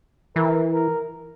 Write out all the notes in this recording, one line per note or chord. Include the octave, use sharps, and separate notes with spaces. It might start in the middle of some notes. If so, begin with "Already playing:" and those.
E3 A#4
A#4